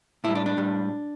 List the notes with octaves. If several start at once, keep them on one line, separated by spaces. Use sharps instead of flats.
A2 G3 E4
D4
D4
A2 G3